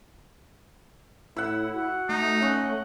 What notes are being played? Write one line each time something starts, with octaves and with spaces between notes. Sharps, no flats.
A2 E4 F#5 E6
F#4
A3 D#4
C#4 D#5 F#5 C#6